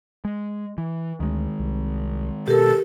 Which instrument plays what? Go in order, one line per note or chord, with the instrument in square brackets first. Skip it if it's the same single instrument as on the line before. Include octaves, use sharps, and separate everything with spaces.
[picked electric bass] G#3
E3
[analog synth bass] D2 [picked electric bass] D#3 G#3
[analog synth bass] C2
[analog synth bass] B2 [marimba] G4 A#4 [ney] A4